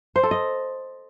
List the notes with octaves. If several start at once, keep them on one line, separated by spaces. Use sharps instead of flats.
C5
A4
D#5